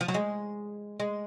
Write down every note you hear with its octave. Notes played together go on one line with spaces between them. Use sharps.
F3
F#3
G#3
G#3